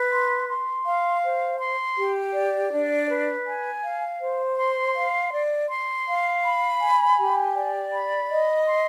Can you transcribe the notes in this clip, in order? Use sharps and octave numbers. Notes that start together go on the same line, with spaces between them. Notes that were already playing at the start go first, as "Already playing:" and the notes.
Already playing: B4
C6
C6
F5
C5
C6
G4
D5
D4
B4
G#5
F5
C5
C6
F5
D5
C6
F5
B5
G#5
G4
D5
B5
D#5
C6